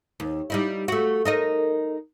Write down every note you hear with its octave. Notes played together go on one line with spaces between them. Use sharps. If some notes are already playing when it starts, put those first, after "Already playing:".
D#2
G3 D#4 E4
A3 F#4
D#4 A#4 D#5